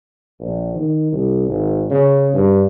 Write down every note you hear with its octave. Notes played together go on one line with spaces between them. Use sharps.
A#1
D#3
C2
G#1
C#3
G2